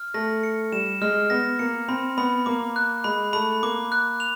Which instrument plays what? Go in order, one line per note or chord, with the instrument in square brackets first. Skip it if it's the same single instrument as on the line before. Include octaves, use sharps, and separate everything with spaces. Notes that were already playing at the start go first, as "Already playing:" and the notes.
Already playing: [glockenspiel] F6
[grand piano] A3 [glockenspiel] A#6
[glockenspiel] C#7
[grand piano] G3 [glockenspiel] E7
[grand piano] G#3 [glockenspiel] F6
[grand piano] B3 [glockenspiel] A#6
[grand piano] A#3 [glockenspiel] C#7
[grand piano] C4 [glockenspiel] B5
[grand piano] B3 [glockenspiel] B5
[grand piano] A#3 [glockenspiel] D6
[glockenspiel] F#6
[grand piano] G#3 [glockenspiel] B5
[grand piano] A3 [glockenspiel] B5
[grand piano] A#3 [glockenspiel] D6
[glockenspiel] F#6
F7